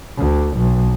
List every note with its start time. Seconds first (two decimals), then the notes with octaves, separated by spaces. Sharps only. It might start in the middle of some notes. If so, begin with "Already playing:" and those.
0.18 D2
0.57 B1